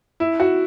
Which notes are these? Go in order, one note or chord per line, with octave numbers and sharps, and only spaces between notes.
E4
F#4